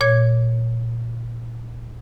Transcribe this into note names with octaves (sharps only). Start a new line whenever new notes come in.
A#2 C#5 G#6